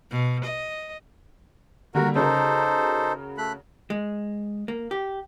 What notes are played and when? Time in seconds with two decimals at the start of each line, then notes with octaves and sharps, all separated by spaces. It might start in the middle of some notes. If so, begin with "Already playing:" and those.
0.12 B2
0.45 D#5
1.95 D3 G3 A#3 F#4 A#4
2.16 C#3 D#4 F#4 A4 A#4 C5
3.38 A3 B5 F#6
3.90 G#3
4.68 A#3
4.91 G4